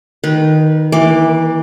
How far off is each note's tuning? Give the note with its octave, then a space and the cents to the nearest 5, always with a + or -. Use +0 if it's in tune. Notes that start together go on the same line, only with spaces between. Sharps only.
D#3 +0 B4 -20
E3 -20 A#3 +25 D6 +0